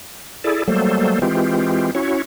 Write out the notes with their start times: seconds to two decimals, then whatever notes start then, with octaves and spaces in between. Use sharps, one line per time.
0.44 E4 G#4 A4 D5
0.68 F#3 G3 A3 A#3 A4 C5
1.22 E3 G#3 C4 F4 G4
1.95 C#4 E4 F#4 C#5